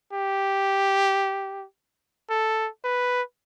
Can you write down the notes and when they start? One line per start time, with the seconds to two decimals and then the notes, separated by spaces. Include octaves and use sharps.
0.13 G4
2.30 A4
2.84 B4